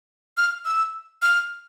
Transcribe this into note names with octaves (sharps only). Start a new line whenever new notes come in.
F6
E6
F6